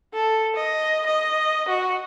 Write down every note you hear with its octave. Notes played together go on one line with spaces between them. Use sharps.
A4
D#5
D#5
F#4